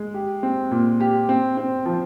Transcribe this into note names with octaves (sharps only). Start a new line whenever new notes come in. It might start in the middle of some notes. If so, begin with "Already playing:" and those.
Already playing: G#3
G4
C4
A#2
G4
C4
C4
F3